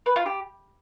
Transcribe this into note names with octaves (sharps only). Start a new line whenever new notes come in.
B4
F4
G4